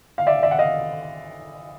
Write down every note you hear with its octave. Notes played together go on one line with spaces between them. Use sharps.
F5
D5 E5
D5 E5
F#5
D#5 F5